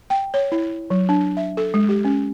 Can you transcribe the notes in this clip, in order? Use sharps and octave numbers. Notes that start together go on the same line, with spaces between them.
G5
C#5
E4
F#3
D4
E5
A4
G#3
G4
C#4